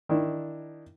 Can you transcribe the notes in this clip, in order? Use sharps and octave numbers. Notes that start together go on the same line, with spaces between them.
D#3 D4 E4